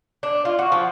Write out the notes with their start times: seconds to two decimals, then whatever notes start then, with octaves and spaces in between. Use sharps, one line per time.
0.23 D4
0.45 F4
0.59 F#4
0.72 F3